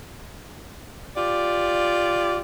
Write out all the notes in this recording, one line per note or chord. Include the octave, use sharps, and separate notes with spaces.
F4 G4 D5